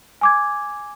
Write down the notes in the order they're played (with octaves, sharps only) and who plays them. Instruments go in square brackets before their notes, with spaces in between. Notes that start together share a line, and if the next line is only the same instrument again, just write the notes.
[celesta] G#5 D6 G#6